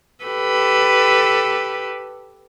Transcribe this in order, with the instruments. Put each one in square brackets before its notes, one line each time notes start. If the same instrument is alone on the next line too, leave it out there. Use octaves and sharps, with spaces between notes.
[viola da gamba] G4 A4 B4